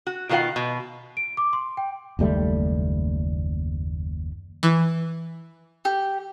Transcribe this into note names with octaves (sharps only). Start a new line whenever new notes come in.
F#4
B2 D#3 F4 B4 F5 F#5
B2
D7
D6
C6
G5
F#1 D#2 G3 A3
E3
G4